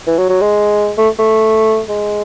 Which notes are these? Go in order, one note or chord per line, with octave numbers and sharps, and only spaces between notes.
E3
F#3
F#3
G#3
A3
A3
G#3